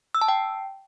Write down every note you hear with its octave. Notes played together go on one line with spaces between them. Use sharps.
E6
A5
G5